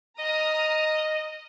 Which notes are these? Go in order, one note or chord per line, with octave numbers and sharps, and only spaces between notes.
D#5 A#5 D#6 F6